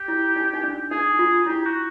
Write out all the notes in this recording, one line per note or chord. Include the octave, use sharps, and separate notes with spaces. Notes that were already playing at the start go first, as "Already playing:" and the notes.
Already playing: G4
E4
D#4
D#4
D4
D#4 G#4
F4
E4 G4
F#4